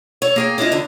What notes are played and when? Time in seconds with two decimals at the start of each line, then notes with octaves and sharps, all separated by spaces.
0.22 A4 C#5
0.36 A#3 G#4 G5
0.58 C#4 D4 E4 F4 D#5
0.72 E2 D3